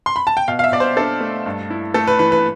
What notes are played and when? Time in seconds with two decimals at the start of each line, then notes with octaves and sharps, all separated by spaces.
0.06 C6
0.16 B5
0.27 A5
0.37 G5
0.48 B2 F5
0.59 F5
0.64 E5
0.72 B2 D5
0.80 C5
0.97 D4 A4
1.21 A3
1.46 G2
1.70 E4
1.94 A3 A4
2.07 B4
2.19 E3 B4
2.32 B4